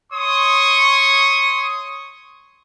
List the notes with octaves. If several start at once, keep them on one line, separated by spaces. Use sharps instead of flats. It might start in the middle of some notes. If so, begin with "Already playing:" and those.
C#5 C6 C#6 D#6